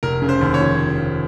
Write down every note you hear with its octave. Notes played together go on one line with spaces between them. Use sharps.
F1 A#4
C#3
C5
D#2
C#5
F3